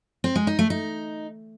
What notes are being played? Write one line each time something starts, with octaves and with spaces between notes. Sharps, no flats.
C4
G#3
D#4
A3
D#4